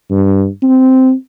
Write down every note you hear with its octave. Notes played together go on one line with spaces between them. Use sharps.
G2
C4